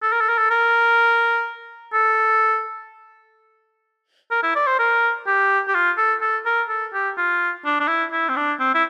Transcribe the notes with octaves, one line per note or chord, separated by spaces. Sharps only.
A4
A#4
A4
A#4
A4
A#4
A4
A#4
E4
D5
C5
A#4
G4
G4
F4
A4
A4
A#4
A4
G4
F4
D4
D4
E4
E4
C4
D4
C4
E4